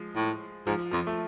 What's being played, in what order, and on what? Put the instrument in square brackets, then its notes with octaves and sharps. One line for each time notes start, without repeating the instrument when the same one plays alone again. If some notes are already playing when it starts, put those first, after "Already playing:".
Already playing: [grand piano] F3 G#3
[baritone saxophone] A2
[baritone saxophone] G#2 [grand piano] F3
[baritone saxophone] F2 [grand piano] F3
[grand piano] A3